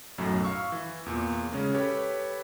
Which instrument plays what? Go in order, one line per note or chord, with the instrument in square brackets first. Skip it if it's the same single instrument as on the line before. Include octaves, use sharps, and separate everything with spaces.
[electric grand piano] B1 F#2 A2 F#3
F5 C#6 E6
E3
E2 A#2
C#3 G#3 C#4
G4 A4 B4 C#5